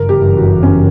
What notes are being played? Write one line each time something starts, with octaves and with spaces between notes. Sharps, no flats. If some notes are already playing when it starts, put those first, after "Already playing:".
Already playing: G1 F#2 C#3 E3 A#4
G4
F#4
C#4